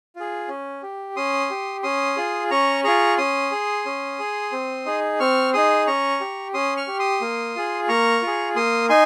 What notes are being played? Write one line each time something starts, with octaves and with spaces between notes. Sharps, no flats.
F4 G#4
C#4
G4
C#4 C6 D#6
G4
C#4 C6 D#6
F4 G#4
C#4 A#5 C#6
F4 G#4 A#5 C#6
C#4 C6 D#6
G#4
C#4
G#4
C4
D#4 G#4
C4 C#6 F6
D#4 G#4 C6 D#6
C#4 A#5 C#6
G4
C#4 C6 D#6
C#6 F6
G4
C6 D#6
A#3
F4 G#4
A#3 A#5 C#6
F4
G#4
A#3 C6 D#6
D#4 G#5 C6